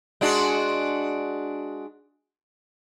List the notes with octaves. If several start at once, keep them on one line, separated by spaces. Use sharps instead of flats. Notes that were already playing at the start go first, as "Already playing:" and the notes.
G#3 D4 F#4